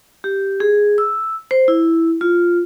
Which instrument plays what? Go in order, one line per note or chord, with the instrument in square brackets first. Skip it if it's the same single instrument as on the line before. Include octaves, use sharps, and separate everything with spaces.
[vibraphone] G4
G#4
E6
C5
E4
F4